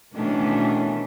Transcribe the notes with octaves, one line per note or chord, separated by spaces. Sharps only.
B2 D#3 E3 A3 C#4 D4